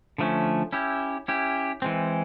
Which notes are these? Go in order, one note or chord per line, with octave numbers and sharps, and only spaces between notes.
D3 F3 A3 C#4
C#4 E4 G4
C#4 E4 G4
E3 G#3 C4